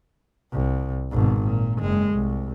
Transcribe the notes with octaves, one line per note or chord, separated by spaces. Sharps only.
C2
G#1 B2
A#2
F#1 G#3
C2